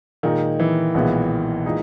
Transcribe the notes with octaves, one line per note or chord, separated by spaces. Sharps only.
A#2 D#3 G#3 D#4
E3
B1 A#2 G#3 B3 E4
A#2 G#3 D#4